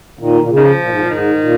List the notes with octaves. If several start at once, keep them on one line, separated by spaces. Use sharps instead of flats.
A#2 D#3
A#2
C#3
D#3
F3
A#2
G#2
A#2
G#2 D#3
A#2